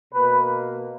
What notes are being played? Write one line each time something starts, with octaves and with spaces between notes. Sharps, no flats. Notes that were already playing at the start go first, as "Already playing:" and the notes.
B2 A#3 B4